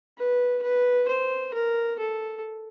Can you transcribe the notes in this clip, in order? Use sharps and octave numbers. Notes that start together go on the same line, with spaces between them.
B4
B4
C5
A#4
A4